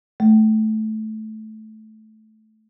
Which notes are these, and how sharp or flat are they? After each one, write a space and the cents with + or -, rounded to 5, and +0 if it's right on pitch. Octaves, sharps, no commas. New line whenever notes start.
A3 -15